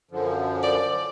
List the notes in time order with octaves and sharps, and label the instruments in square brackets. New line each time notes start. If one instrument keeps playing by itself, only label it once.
[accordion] F#2 D3 F3
[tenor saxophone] D5